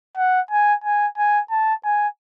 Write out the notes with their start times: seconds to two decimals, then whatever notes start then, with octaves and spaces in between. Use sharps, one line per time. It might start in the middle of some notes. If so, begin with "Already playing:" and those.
0.17 F#5
0.51 G#5
0.84 G#5
1.18 G#5
1.51 A5
1.85 G#5